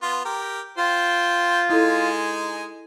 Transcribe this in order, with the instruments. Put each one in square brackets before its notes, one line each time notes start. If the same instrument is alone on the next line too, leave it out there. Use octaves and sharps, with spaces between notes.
[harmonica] B3 F4
G4 A#4
[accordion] F4 [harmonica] C5 G5
[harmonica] G#3 D#4 G#5 [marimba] E4 A4